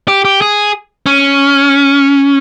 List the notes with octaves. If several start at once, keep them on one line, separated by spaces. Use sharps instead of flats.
G4
G4
G#4
C#4